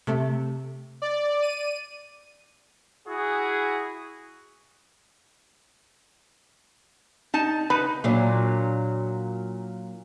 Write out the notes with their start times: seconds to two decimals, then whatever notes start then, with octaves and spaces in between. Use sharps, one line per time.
0.07 C3 A3
1.02 D5
1.42 D#7
3.08 E4 F#4 G#4
7.34 D#4 A5
7.70 D#4 B4 B5
8.04 A#2 F#3 D4